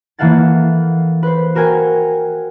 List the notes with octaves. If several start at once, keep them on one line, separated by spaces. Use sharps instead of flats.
E3 A#3 A4 F5 F#5 A6
B4 C5
F#4 A#4 G5 G#5